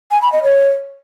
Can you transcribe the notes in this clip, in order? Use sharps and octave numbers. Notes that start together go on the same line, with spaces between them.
G#5
B5
D#5
C#5